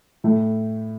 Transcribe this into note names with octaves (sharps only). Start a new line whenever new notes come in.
A2 A3